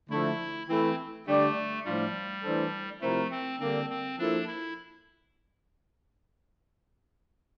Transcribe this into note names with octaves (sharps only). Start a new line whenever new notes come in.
D3 F3 A3 E4
E3 A3 C4 E4
D3 G3 A3 D4 G4 D5
A2 F3 G3 A3 D4 F4
E3 A3 D4 A4 C5
C3 F3 A3 C4 E4 A#4
C4
D3 G3 A#3 C4 D4
C4
F3 A#3 D4 E4 A4
E4